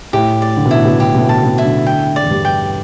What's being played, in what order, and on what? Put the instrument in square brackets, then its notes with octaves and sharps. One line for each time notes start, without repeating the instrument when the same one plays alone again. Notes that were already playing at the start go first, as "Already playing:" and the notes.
[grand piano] A2 [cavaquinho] G4
[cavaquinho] D5
[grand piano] D3
B2
[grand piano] A2 [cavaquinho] E4
[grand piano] B2
[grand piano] D3 [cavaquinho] G4
[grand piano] B2
A2
[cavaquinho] A5
[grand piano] B2
[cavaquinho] E4
[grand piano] D3
[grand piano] D3 [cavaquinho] G5
[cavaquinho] D5
[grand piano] E2
G2
[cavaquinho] G5